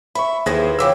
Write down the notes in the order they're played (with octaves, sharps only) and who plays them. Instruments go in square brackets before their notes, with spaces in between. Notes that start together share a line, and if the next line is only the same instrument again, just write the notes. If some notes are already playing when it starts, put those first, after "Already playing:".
[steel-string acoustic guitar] E5 [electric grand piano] B5 C#6
[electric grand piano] D#2 G#4 A#6 [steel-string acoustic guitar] E4 B4 C5
[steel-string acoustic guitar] C#3 E3 F3 [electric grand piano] G5 D6 E6